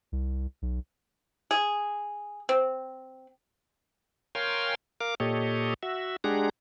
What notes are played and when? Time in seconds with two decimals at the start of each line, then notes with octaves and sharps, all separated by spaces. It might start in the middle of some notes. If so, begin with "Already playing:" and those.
0.12 C2
0.62 B1
1.51 G#4
2.49 C4
4.35 A#4 C#5 F5 G5 G#5 C6
5.01 A#4 F5 D6
5.20 A#2 G4 A4 C#5 D#5
5.83 F#4 E5
6.24 G#3 D4 G4 G#4 F#5 A#5